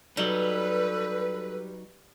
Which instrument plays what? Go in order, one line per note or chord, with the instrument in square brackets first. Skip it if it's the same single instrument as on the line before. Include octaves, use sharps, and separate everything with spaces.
[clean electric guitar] F#3 D#4 [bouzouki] G3 [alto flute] A4 [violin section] B4